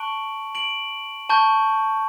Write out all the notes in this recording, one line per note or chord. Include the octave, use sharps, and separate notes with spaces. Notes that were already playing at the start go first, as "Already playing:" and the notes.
Already playing: A5 C#6 F#6 D7 F#7
D7 F#7
A5 C#6 G6